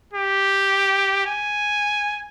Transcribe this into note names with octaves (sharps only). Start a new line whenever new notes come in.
G4
G#5